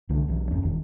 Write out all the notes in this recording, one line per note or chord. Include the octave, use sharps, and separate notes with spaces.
C2 D3 A3
B1 E3
G#1 F2 C#4
E1 D#3